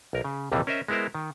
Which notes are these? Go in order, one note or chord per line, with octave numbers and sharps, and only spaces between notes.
B1 A#4
C#3
A#1 D#2 C3 E3 G3
C#4 A#4 C5 D#5 E5
G#3 B3 E4 A#4 C5
D#3